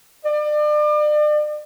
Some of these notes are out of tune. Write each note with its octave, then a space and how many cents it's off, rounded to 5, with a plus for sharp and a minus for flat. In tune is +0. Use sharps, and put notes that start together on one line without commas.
D5 +40